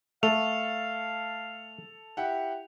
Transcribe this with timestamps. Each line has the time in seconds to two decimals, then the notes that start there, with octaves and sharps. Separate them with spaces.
0.23 A3 A4 F5 F7
2.17 E4 G4 F#5